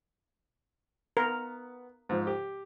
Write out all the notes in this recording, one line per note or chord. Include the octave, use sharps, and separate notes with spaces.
B3 A#4
G#2 F3
G4